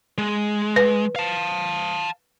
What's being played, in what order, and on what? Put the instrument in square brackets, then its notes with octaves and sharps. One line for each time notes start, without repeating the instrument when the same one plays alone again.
[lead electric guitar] G#3
[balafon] B4
[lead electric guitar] F5 A5